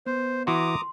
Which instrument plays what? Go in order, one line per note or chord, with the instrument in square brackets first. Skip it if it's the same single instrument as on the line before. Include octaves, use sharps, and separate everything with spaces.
[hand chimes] B3 [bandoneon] C5
[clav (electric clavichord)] E3 F#4 [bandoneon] A#5 D6 D#6 [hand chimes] C6